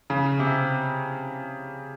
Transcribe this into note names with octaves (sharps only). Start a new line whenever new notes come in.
C#3
C3